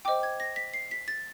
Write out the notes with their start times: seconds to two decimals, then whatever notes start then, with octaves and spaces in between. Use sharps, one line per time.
0.05 C5 D#5 G5 D6
0.23 G#6
0.40 A#6
0.56 B6
0.74 C7
0.91 B6
1.08 A6